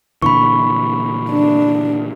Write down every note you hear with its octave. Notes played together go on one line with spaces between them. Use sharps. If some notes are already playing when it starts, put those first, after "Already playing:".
A#2 D3 E3 B5 C#6
D4